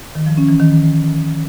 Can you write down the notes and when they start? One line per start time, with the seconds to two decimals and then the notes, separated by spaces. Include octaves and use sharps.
0.15 D#3
0.26 F3
0.37 C#4
0.49 E3
0.60 D#3